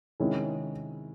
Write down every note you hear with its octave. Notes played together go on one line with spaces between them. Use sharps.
C3 D#3 G#3 C#4 E4